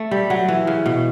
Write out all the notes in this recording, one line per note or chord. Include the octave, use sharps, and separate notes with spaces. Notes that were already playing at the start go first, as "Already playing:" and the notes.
Already playing: A3
G3
F#3
E3
C#3
B2